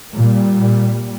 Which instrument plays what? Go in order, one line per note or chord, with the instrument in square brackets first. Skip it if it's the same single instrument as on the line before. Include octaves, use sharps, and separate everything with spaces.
[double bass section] A#2 G3